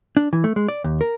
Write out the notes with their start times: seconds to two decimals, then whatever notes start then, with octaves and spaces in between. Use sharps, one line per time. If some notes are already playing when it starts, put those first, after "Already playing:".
0.17 D4
0.33 E3
0.44 A3
0.56 G#3
0.68 D5
0.84 D#2
1.01 A#4